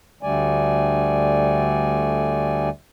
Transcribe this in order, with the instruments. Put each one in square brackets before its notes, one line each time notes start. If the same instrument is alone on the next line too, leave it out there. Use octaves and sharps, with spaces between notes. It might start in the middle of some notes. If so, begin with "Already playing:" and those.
[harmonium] D2 D3 G3 A3 D5 G#5